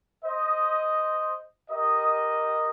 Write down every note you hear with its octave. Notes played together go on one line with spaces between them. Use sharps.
C5 D#5
G4 A#4 D#5